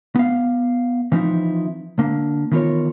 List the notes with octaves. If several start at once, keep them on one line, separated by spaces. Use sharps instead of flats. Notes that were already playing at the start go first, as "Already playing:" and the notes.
B3 F5
E3 F3 C4 D#4 E4
D3 A#3
D#3 E3 B3 F4 A#4 C#5